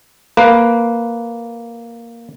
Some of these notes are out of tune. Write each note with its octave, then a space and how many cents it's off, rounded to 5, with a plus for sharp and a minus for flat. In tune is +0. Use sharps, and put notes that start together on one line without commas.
A#3 +0 B4 +0